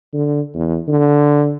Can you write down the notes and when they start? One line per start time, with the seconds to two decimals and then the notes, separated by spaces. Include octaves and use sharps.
0.13 D3
0.55 E2
0.88 D3